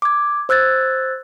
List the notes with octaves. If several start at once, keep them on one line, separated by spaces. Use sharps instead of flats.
D6 G#6
C5 E6 F#6 G#6 A6